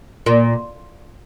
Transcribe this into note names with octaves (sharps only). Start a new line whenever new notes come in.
A#2